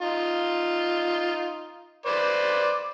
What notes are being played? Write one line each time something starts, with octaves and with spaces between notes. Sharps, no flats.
D#4 F4
B4 C5 D5